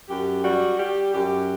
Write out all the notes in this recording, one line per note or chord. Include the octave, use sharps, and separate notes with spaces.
F#2 G4
G3 F#4
G3 G4
F#2 G4